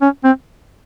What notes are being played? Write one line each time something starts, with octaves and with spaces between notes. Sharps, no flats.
C#4
C4